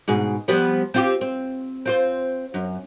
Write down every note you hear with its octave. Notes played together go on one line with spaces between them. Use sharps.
G#2 B2 G#4
F3 G3 B3
C4 F4 G4
C4
C4 F4 C5
F#2